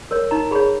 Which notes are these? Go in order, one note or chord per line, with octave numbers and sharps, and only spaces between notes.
A#4 C#5
D#4 A#5
G#4 C#5 B5